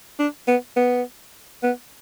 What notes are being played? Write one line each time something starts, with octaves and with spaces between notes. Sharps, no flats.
D4
B3
B3
B3